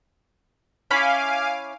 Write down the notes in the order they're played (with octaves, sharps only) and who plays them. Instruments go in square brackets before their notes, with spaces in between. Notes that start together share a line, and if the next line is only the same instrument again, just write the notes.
[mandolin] C#4 E4 B5 [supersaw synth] F5 G#5 D6